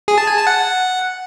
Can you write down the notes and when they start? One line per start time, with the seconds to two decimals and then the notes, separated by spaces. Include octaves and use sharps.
0.08 G#4
0.18 A5
0.27 G#5
0.37 A5
0.47 F#5